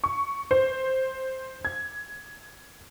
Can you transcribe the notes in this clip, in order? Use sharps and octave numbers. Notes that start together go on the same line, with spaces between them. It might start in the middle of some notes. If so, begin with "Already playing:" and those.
C#6
C5
G#6